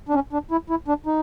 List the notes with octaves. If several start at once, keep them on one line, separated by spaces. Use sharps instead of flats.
D4
C#4
D4
E4
E4
D4
D#4